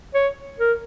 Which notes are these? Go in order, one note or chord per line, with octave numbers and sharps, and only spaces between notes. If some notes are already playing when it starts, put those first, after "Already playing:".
C#5
A#4